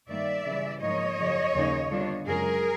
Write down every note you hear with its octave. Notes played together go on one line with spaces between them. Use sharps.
G2 D#3 G3 A#3 D5 E5
C#3 E3 G3
G#2 F3 A#3 D#4 C#5 D#5
F#2 C#3 F3
D#2 C#3 F3 A#3 D#4
D3 G3 B3 D4 F4
F#2 C#3 F3 G#3 C#4 G#4 A#4